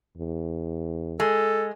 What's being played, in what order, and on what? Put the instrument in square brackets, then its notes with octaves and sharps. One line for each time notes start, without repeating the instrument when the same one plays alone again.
[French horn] E2
[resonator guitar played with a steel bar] G#3 [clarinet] A4